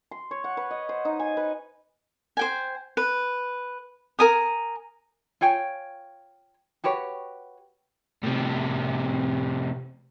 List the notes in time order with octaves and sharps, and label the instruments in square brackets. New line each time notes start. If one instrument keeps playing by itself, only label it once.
[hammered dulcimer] C6
C#5
F#5
B4
D#5
C5
D#4
G#5
B4
[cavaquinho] C5 G5 G#5
B4
A#4 G#5 D#6
[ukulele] F4 C#5 G5 G#5
F#4 G4 B4 C#5
[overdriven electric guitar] A2 C3